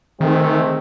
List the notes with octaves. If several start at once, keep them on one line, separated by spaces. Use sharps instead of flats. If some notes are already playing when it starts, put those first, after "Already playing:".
C3 D#3 G#3 A3 C4